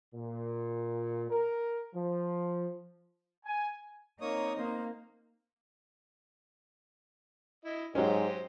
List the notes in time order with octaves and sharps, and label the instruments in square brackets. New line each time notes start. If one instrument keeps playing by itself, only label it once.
[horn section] A#2
A#4
F3
[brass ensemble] G#5
[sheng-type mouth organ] A#3 C#5 D#6 [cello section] C4 D#4
[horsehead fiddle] A#3 [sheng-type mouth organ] C5
[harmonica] E4 D#5
[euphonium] G#2 [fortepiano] F#3 C#4 [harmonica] G4 C5 D#5